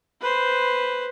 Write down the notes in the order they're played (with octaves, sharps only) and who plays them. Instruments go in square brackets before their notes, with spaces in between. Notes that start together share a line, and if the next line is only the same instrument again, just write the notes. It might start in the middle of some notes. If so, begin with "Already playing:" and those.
[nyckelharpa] B4 C5